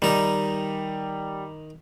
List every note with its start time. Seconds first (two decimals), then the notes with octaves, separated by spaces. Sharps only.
0.02 D#3 G3 D#4